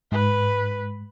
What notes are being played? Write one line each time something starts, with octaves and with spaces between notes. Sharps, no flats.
G#2 B4